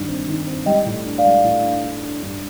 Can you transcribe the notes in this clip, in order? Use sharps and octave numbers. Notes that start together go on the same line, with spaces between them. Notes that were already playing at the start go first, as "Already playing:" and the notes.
Already playing: G2 D#3 G3
C4
D#3
C4
G3 D#5 G5
A2
D4
D5 F5
G3
A2
D4
D4
D4
G2